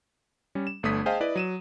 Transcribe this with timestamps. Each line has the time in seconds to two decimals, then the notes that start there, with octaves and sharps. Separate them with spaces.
0.55 G3 C#4
0.67 E7
0.83 G1 A3 D4 D#6 B6
1.06 G#4 C5 D#5 F5 G5 A5
1.20 E4 B4 D5 D#5
1.36 F#3 D#7 E7